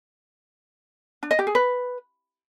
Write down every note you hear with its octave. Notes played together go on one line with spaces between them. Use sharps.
D4
D#5
G4
G#4
B4